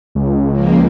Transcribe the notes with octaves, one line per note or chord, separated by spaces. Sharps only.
C#2
F3 A#3